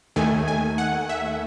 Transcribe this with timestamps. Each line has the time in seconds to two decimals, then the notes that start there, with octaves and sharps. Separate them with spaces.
0.16 D#2 D#3 A3 G#5
0.48 G#5
0.78 F#5
1.09 E5